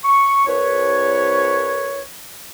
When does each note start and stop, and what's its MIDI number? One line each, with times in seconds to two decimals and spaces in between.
0.04 0.46 85
0.47 2.02 36
0.47 2.02 71
0.47 2.02 73